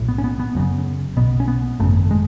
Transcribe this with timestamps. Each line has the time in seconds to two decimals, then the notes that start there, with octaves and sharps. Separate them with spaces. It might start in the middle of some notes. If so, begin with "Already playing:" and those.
Already playing: B1 A2
0.08 B3
0.18 C#4
0.24 B3
0.39 B3
0.55 F#1 F#2 C#3
1.17 B1 B2 B3
1.40 C#4
1.48 B3
1.80 G#1 F#2 C#3 A3
2.11 G#3